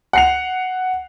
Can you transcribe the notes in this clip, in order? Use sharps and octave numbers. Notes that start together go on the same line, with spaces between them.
F#5 C7 F7